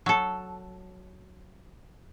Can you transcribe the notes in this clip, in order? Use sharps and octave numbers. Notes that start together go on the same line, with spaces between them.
F#3 A4